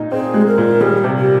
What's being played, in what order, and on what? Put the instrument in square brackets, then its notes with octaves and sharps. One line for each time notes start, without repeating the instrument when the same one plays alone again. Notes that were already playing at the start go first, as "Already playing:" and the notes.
Already playing: [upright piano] A#2 D#4
[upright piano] C4 [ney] G#4
[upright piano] G#3
[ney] A#4
[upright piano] A#2
[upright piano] G3 [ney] G#4
[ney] G4
[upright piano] C3
[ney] G4